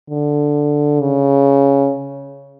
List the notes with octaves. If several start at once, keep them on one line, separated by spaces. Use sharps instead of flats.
D3
C#3